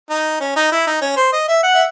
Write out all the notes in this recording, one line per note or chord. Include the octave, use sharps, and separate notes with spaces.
D#4
C#4
D#4
E4
D#4
C#4
C5
D#5
E5
F#5
E5